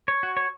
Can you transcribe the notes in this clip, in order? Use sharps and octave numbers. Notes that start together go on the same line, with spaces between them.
C#5
F#4
C#5